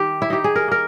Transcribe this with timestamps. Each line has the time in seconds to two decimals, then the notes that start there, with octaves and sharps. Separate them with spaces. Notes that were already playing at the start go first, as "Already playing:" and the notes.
Already playing: D#3 G4
0.22 E4
0.30 D#4 G4
0.44 G#4
0.56 A#4
0.68 A#3 A#4